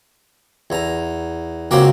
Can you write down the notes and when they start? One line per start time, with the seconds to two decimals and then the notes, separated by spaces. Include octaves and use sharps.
0.70 E2 A#5
1.71 C#2 F#3 A#3 C4 C5 D6